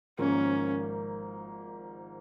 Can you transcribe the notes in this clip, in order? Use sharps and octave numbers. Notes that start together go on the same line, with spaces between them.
G#1 G#2 F3 A#3 C#4